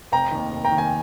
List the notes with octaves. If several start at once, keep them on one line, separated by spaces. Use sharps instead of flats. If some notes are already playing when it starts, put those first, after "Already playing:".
F1 G5 A#5
D#2 D#3
F1
G5 A#5
D#2 D#3
G#5